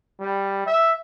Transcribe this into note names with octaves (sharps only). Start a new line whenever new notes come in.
G3
E5